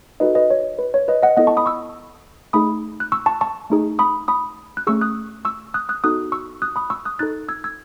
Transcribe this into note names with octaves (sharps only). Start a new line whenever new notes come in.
D#4 F#4 A4 B4 D#5
B4 D#5
C#5
B4
C#5
B4 D#5
D#5 F#5
B3 E4 A4 D#5 F#5
A5 C#6
B5 D#6
C#6 E6
A3 D#4 G#4 B5 D#6
F#6
C#6 E6
A5 C#6
A5 C#6
A3 D#4 G#4
B5 D#6
B5 D#6
F#6
A3 C#4 G#4 C#6 E6
D#6 F#6
C#6 E6
D#6 F#6
D#6 F#6
B3 D#4 F#4 A4 D#6 F#6
C#6 E6
D#6 F#6
B5 D#6
C#6 E6
D#6 F#6
D#4 A4 F#6 A6
E6 G#6
E6 G#6